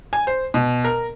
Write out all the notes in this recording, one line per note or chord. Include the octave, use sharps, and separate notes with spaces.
G#5
C5
B2
A#4